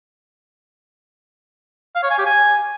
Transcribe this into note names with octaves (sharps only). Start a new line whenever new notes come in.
F5
C#5
G#5
G4
G#5